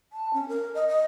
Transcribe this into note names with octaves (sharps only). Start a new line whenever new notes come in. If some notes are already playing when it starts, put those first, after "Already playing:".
A5
C#4
A#4
D#5
D#5